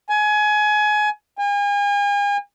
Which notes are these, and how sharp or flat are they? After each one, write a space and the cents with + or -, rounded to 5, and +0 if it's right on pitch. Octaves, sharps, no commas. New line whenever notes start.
G#5 +25
G#5 -40